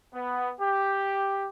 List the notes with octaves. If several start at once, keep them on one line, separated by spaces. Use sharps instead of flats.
B3
G4